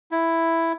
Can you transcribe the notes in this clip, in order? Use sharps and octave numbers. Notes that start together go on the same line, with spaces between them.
E4